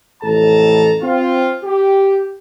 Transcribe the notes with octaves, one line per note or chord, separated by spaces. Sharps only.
A1 F2 A2 A4 A5 A#5
C4 F4
G4